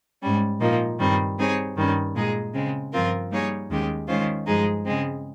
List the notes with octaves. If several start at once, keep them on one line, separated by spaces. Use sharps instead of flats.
G#2 G3 C#4
A#2 F3 A#3 D#4
G2 D#3 G3 C4
G3 C4 D#4 G#4 C#5
G2 D#3 G3 C#4
A#2 G#3 D#4 G#4
C#3 G#3 C4
G2 F3 C4 F4 A#4
G3 A#3 D#4 G#4 C#5
D#2 D#3 G#3 C#4 G4
D#3 G#3 C#4 F4 C5
G2 F3 G#3 D#4 G#4
C#3 G#3 C4